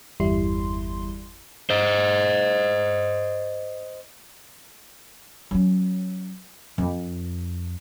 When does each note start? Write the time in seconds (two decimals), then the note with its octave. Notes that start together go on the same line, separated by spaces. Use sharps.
0.20 G1 E2 G3 E4 C6
1.70 C5 D#5
5.51 F#3 C#4
6.78 F2